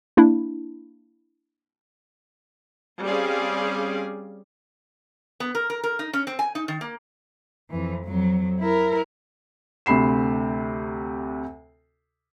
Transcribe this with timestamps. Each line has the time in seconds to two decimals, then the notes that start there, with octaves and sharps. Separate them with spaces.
0.17 A#3 D4 E4
3.04 G3 C4 C#4 G#4 D5 F5
5.40 B3
5.55 A#4
5.70 A#4
5.84 A#4
5.99 D#4
6.13 C#4
6.27 C4
6.39 G#5
6.55 D#4
6.68 D#3
6.81 A#3
7.70 F2 E3
8.05 F2 F#3
8.60 E4 A#4
9.86 D2 C3 B5 C7 E7